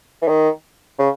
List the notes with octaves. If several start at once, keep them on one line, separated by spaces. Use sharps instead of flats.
E3
D#3
C#3